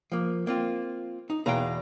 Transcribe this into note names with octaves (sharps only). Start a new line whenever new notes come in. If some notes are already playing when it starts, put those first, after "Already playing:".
F3 A#3
A#3 C4 F4
D#4
E2 B2 G#4 F5 G5 A#5